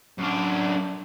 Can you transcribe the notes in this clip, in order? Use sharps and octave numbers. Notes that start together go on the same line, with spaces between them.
F#2 D4